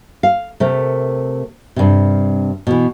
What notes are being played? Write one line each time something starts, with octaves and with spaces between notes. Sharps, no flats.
F5
C3 A3 A#4
G2 C3
B2 E3